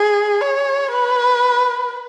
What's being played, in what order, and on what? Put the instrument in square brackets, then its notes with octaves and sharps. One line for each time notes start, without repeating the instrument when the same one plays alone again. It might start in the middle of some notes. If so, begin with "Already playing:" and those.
Already playing: [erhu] G#4
C#5
B4